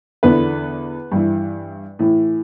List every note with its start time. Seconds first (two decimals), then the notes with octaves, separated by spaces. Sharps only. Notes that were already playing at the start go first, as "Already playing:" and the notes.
0.23 E2 D3 B3 B4
1.12 G2 E3
1.99 A2 E3